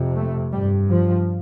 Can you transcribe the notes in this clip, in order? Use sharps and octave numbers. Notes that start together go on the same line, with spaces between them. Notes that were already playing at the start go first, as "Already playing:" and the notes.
Already playing: F2 C3
A3
G2 G3
F3